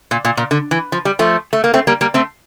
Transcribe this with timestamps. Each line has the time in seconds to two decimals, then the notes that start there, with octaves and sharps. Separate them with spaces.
0.11 A#2
0.25 A#2
0.37 A#2
0.51 D3
0.71 E3
0.92 F3
1.05 G3
1.19 F3 A3
1.53 A3
1.64 A#3
1.74 A3 C4
1.87 G3 A#3
2.01 G3 A#3
2.14 A3 C4